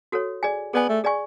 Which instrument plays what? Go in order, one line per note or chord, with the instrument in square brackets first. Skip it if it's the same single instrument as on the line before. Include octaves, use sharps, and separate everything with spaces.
[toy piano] F#4 A4 C#5
G#4 D5 G#5
[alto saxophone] B3 [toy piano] G#4 D5 G#5
[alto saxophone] A3
[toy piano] G#4 D5 G#5 C#6